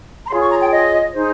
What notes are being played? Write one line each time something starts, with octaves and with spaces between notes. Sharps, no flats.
A#5
F4 G#4 C#5 C6
C#6
A#5
G5
D#5
D#4 G#4 C5